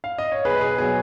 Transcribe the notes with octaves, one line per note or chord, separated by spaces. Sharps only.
F5
D#5
C#5
B1 G#4 B4
G#4
B2 F#3 G#4